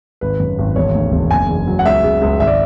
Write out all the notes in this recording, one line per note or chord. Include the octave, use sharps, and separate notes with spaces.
G#1 B4
F#2
G#1
E1 C#5
D2
E1
F#1 G#5
E2
F#3
F#5
C#2 E5
C#3
C#2
G#1 E5
D5